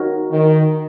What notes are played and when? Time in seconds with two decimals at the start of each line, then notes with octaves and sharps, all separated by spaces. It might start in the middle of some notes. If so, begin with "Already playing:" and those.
Already playing: D#4 F#4 A#4 C#5
0.31 D#3